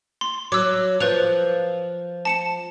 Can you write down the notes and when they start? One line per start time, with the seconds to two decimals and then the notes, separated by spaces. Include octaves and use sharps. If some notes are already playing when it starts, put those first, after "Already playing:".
0.21 C6
0.52 F#3 D6 E6
1.00 F3 B4 F#6 F7
2.25 A5 C#7 E7